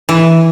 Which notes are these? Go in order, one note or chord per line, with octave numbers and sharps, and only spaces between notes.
E3